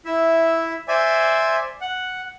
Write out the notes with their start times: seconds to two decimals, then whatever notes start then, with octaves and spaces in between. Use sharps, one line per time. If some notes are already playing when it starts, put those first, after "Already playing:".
0.05 E4 E5
0.88 C5 D5 E5 G#5
1.81 F#5